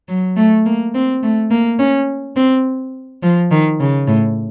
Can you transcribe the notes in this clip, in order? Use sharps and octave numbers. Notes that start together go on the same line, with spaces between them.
F#3
A3
A#3
C4
A3
A#3
C#4
C4
F3
D#3
C#3
A2